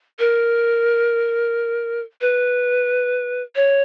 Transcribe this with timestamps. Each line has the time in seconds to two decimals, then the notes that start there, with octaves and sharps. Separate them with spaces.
0.19 A#4
2.21 B4
3.56 C#5